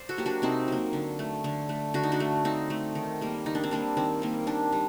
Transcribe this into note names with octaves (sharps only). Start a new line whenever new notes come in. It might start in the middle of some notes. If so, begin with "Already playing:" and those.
Already playing: C5 D5
F#4 A4
F#3 A#3 G4
D4 F#4
C3 C4 D#4
F#3 A#3
D3
A3
D3
A3
D3 F#4
D#4
D4 F#4
A3
D3 C4 D#4
A3
D#3
G3 A#3
D#3 D#4
D4
C4
G3 A#3 D4
D#3 C4
G3 A#3
D#3 D4
G3